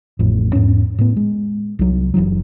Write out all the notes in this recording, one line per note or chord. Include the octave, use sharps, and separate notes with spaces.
A1 F2 A2
E2 G#2 C#4
A2 B3
G#3
C2 F#3
F#1 C#2 E3 F#3